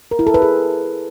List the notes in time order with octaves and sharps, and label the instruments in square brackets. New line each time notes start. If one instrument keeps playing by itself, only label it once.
[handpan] A#4
E4
A4
B4
G#4